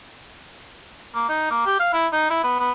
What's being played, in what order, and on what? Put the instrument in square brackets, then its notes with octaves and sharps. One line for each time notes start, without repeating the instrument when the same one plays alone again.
[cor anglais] A#3
D#4
A#3
G4
F5
E4
D#4
E4
B3
B3